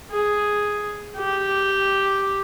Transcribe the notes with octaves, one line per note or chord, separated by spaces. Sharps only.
G#4
G4